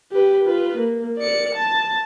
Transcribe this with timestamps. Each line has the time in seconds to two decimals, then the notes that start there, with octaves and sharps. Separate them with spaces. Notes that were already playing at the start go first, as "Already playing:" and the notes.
0.12 G4 B4
0.45 F4 B4
0.77 A#3
1.17 D5 C#7
1.54 A5